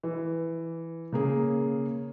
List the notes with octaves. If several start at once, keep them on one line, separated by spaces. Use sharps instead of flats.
E3
C#3 A#3 G#4